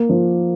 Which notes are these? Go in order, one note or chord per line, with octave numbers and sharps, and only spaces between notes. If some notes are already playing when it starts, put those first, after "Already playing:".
Already playing: A#3
F3